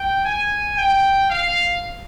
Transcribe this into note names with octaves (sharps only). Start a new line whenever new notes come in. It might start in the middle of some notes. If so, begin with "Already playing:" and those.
Already playing: G5
G#5
G5
F5